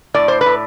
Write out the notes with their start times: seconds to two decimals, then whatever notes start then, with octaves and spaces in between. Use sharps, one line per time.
0.14 A2 D5
0.28 C5
0.41 B4
0.46 A2